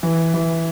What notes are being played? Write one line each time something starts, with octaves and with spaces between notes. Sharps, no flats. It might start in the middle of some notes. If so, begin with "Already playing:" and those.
E3
E3